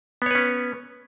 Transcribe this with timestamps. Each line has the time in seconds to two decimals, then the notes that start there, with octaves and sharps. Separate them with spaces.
0.22 B3
0.26 C#5
0.31 B4
0.35 C#4